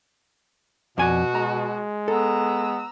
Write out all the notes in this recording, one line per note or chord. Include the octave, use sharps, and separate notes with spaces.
F2 B2 F#4 D5 G#5
G#3 A#5
B3 A4 A#5 E6